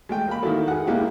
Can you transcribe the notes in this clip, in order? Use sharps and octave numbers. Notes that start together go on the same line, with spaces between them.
G#3 A3 G5
A#3 B5
D#3 A#3 E4 F#4 A4
G#4 F#5
B2 G#3 A#3 E4 G4 G#4